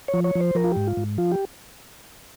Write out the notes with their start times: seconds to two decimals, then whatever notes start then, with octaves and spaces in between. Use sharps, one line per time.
0.08 C#5
0.14 F3
0.24 C#5
0.35 F3
0.41 C5
0.55 F3 A#4
0.64 F4
0.72 G#2 G4
0.87 F4
0.97 G#2
1.18 F3 F4
1.32 G4